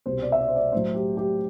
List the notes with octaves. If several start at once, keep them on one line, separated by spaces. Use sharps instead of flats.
C2 B2 G3 C5
D5
E5
D5
C5
D5
A2 F#3 C5
G4
G4